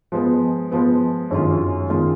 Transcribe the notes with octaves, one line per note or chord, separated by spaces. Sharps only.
F3 G#3 B3
F3 G#3 B3
F#2 D#3 G#3 C#4 F4
D#3 G#3 C#4 F4